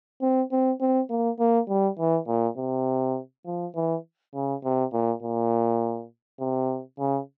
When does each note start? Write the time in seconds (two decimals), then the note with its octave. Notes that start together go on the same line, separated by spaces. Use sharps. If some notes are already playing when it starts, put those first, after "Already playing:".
0.22 C4
0.52 C4
0.80 C4
1.10 A#3
1.39 A#3
1.69 G3
1.99 E3
2.27 A#2
2.57 C3
3.46 F3
3.75 E3
4.34 C#3
4.64 C3
4.93 A#2
5.23 A#2
6.40 C3
6.99 C#3